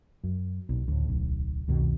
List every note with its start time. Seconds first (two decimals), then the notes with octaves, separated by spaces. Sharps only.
0.24 F#2
0.69 B1 A#2
0.88 D2 A2
1.09 D1 B1
1.68 C2 F2 B2 D#3